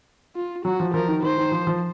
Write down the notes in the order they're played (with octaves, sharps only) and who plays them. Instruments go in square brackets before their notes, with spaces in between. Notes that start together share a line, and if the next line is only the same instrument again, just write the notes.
[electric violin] F4
[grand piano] F#3 [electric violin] F#4
[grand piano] F3
[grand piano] F3 [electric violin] A#4
[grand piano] D#3
[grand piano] D#3 [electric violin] C5
[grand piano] D#3
F3
F3